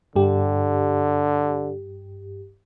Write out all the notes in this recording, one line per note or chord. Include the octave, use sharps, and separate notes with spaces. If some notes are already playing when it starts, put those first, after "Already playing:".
G2 D3 G4